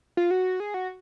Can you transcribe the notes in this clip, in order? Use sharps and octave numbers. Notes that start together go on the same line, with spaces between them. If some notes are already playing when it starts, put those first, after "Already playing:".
F4
F#4
G#4
F#4